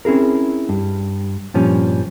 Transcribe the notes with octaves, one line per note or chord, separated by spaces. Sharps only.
C4 C#4 E4 G#4 A#4
G2
G2 A#2 F3 C#4